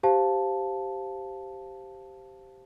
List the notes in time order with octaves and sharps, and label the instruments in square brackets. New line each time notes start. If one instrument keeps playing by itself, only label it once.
[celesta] G4 C5 F5 A5